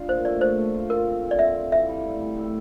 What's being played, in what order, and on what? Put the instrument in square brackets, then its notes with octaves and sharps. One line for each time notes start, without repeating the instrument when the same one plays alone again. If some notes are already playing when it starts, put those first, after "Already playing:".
Already playing: [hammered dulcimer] D4 F4
[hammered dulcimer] A#2 [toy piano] C5
[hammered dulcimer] A3 [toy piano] D5
[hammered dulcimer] A3 [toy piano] C5
[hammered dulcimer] A3
F4
[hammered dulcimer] F4 [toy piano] A#4
[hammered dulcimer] C4
C4
[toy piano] D5
[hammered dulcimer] C4 [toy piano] E5
[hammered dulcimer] C4
[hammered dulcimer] E3 [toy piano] E5
[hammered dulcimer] G3
A2
G3
A2